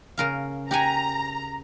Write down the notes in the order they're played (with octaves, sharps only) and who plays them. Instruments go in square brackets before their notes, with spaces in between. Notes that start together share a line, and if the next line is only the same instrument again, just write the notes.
[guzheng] C#3 A#4 F5
[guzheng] G4 F#5 G#5 [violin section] A#5